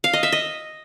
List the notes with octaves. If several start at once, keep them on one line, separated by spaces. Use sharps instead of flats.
F5
D#5
E5
D#5